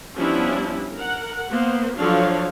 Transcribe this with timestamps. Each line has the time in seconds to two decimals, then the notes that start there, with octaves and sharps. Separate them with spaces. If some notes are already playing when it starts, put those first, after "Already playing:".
0.16 F3 G3 B3 C#4 D4 E4
0.94 A#4 F#5
1.52 A#3 B3 C5
1.99 F3 F#3 D4 A4 C#5 F5